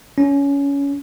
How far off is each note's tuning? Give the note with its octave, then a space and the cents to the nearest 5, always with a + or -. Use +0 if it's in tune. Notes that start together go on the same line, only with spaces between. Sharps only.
C#4 +20